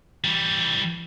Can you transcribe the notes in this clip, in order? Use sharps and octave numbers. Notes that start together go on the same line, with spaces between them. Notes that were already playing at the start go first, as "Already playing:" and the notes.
E3 G3